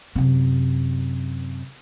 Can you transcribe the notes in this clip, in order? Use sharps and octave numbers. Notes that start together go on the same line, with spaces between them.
F#2 C3